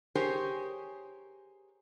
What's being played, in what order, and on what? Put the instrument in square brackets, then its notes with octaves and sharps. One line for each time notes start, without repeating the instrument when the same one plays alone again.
[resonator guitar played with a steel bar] G4 G#4 A#4 C5 C#5